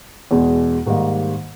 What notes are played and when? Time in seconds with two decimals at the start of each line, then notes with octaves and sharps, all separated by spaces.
0.31 E2 B2 G#3
0.86 G#2 D#3 G3 A#3